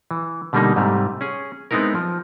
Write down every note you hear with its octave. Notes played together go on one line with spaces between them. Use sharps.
E3
B2 D3 G3 A3 A#3 D#4
G#2 C3 G3 A3
C#4 G#4
G#3 B3 C4 D#4 E4 A#4
F3